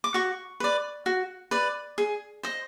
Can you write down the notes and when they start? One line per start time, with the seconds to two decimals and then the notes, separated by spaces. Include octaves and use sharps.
0.04 D6
0.14 F#4 C#6
0.60 B4 D5
1.06 F#4
1.51 B4 D5
1.98 G#4
2.43 C5 D#5